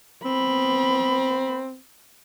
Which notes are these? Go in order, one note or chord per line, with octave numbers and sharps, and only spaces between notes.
B3 C4 B5